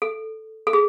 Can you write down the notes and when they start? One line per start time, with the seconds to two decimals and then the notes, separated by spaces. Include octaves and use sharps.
0.02 A4
0.67 A4
0.73 G#4